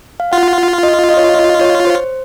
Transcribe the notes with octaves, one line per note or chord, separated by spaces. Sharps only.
F5
F4 F#5
F5
D#5
D#5
C#5
D#5
D#5
C#5
C5